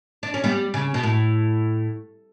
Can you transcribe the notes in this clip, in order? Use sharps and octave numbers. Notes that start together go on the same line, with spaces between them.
D4
C#4
G3 B3
C#3
B2
A2